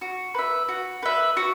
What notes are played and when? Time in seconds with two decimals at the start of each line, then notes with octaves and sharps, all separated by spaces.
0.01 F#4
0.34 B4 E5
0.69 F#4
1.03 B4 E5
1.37 F#4